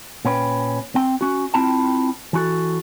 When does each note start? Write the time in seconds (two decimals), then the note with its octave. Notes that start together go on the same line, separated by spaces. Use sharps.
0.25 A#2 C#4 B4 G5
0.95 C4 G5
1.21 C#4 F#4
1.54 C4 E4 F4 G5 A5
2.33 E3 F#4 A4